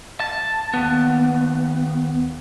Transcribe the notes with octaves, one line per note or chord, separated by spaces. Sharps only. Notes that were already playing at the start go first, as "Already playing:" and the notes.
A5
D#2 B3